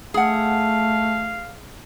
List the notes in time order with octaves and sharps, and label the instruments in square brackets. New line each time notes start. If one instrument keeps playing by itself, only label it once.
[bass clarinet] A3 [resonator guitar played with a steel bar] G#4 F#5 [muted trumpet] F5